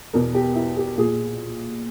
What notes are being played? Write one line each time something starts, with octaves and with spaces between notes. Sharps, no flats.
E2 B2 A#4
G4
E4
G4
A#2 G#4